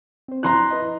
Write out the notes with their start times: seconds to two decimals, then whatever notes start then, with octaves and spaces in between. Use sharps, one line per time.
0.28 C4 C5
0.43 F3 E4 A#5 C6 F#6
0.71 E4 B4 D#5